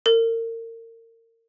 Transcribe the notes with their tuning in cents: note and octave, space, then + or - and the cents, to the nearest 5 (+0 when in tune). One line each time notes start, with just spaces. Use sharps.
A#4 -35